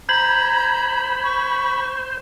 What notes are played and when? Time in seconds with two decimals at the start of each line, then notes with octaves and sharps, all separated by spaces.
0.09 C5 A#5 B5 G6 G#6 F#7
1.24 C#6